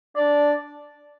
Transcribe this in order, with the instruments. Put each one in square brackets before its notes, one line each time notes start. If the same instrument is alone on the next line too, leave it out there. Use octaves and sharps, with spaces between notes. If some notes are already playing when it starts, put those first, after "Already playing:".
[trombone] D4 [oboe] D5